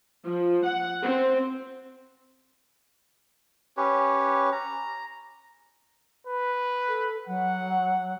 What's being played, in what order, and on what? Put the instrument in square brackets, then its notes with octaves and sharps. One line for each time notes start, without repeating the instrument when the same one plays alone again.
[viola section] F3
F#5
C4
[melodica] C#4 G4 B4 C#5
A#5
[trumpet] B4
[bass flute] A4
[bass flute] F#3 [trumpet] F#5